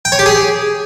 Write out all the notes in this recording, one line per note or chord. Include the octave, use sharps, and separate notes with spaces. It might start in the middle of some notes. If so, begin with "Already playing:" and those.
G5
C#5
G4
G#4